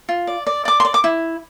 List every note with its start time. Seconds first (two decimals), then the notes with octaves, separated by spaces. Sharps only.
0.09 F4
0.27 D5
0.47 D5
0.65 D5 D6
0.80 C6
0.85 D5
0.94 D6
1.04 E4